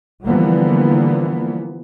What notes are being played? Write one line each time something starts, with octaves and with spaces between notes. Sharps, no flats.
D3 E3 F3 G3 A#3 B3